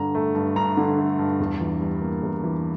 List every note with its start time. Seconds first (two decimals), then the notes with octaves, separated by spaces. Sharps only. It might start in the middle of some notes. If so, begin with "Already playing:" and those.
Already playing: G2 D3 A#5
0.15 A3
0.35 G2
0.56 G2 A#5
0.77 D3
0.98 A3
1.19 G2
1.40 E2
1.60 E3
1.81 G3
2.02 A#3
2.23 E2
2.44 E3